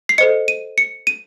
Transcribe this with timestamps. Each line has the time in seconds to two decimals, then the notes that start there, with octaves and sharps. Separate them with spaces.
0.09 C7
0.18 A4 C5 D#5 C#7
0.48 D#7
0.78 C#7
1.07 D#7